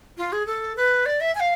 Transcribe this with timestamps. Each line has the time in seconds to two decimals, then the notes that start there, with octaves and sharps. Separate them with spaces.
0.18 F4
0.32 G#4
0.47 A4
0.77 B4
1.06 D5
1.21 E5
1.35 G#5
1.40 F5